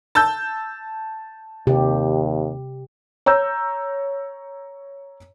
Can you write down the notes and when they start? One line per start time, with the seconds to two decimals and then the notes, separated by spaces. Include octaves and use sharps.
0.15 A5 E6 G6
1.67 D#2 C3 G4
3.26 C#5 A#5 E6 G6